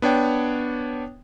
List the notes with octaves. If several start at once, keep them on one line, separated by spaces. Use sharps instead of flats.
B3 D4 C#5 G5